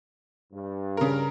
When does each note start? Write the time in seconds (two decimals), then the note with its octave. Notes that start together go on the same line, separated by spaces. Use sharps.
0.52 G2
0.97 C#3 A#4